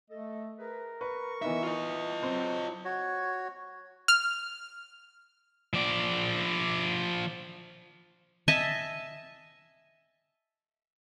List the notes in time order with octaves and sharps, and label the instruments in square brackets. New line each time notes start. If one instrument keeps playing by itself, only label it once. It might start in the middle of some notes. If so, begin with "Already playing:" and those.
[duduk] A3 [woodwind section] A4 D#5
[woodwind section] G#4 B4 [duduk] A#4
[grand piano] B4 [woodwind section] C#6
[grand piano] E3 B3 D#4 [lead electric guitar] E5
[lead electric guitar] F4 D#5
[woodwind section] C#3 A#5 C#6 [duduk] F#3 [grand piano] C4 C5
[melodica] F#4 C#5
[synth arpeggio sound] F6
[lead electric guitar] F3 D5
[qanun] D#5 E5 G#5 A5